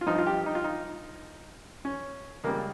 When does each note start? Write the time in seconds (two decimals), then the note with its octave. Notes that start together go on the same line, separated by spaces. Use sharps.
0.01 F4
0.06 G2 F3 D#4
0.18 F4
0.27 G4
0.46 D#4
0.55 F4
0.64 D#4
1.85 C#4
2.44 C#2 C#3 G3 A#3